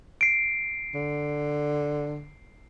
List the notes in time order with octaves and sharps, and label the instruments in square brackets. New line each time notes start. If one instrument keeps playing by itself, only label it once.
[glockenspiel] C7 D7
[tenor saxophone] D3